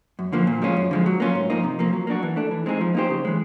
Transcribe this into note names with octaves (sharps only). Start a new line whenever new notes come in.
F#2
D3 F3 A#3
A#2
F3 G#3 C#4 F4
F#2
D3 F3 G#3
F#3
A#3 C#4 F4
G#2
F3 A#3 D#4
C3
F3 A#3
F#3
A#3 D4 F#4
E3
A3 D4
E3
G#3 C4 D#4 G#4
F3
A#3 D#4 G4 C5
C#3
E3 G#3